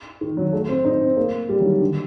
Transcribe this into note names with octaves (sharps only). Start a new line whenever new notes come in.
D#3
F#3
A3
C4
D#4
C4
A#3
G3
F#3
D#3
D3